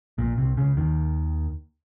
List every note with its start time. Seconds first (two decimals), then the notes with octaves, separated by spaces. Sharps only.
0.18 A#1 A#2
0.38 C2 C3
0.57 C#2 C#3
0.77 D#2 D#3